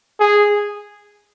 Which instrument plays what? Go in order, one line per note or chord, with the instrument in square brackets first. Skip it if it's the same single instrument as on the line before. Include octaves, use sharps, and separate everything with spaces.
[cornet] G#4